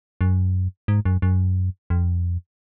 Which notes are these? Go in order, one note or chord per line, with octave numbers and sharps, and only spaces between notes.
F#2
G#2
F#2
F#2
F2